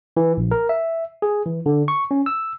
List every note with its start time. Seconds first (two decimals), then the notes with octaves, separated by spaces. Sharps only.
0.17 E3
0.37 A#1
0.51 A#4
0.69 E5
1.22 G#4
1.46 E3
1.66 D3
1.88 C#6
2.11 C#4
2.26 E6